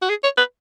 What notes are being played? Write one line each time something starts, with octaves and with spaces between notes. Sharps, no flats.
F#4
G#4
C#5
B4